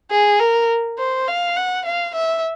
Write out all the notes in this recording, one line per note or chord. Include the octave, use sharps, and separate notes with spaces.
G#4
A#4
C5
F5
F#5
F5
E5